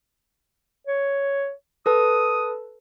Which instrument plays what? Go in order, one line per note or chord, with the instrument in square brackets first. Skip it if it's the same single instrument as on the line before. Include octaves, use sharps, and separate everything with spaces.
[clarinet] C#5
[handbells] A4 B4 A5 [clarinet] D#6